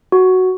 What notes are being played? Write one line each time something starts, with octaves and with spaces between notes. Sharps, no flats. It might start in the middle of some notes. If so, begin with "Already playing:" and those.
F#4